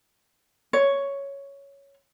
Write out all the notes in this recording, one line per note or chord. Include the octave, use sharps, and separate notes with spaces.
C#5